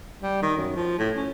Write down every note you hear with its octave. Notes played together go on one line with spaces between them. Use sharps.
G3
D#3
F#2
F3
A2
C#4